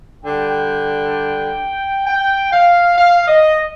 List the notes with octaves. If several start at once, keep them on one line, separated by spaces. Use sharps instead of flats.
D3 G3 G5
G5
F5
F5
D#5